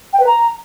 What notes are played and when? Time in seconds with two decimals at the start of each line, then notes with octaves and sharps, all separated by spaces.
0.13 G5
0.20 B4
0.26 A#5